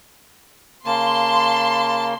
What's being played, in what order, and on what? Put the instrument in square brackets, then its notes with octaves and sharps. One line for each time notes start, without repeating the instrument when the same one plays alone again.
[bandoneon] C#3 A#3 [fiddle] A5 [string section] C6